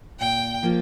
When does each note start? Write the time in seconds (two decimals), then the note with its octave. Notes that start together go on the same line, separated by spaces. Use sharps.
0.20 A#2 G5
0.63 F3 A#3 F4